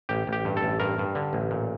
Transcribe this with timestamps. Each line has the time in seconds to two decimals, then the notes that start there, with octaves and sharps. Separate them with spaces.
0.09 A1 G4
0.27 A1
0.33 G4
0.45 G2
0.57 A4
0.63 A1
0.80 G2 A#4
0.98 G2
1.15 D3
1.33 A1
1.51 A#2